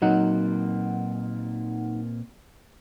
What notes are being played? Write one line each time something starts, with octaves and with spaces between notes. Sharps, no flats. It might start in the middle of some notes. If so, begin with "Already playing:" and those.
A#2 F#3 A#3 C4 D#4 F#5